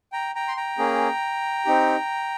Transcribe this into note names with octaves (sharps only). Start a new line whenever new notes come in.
G5 A#5
G5 A#5
C6
G5 A#5
A#3 C#4 G#4
C4 D#4 G4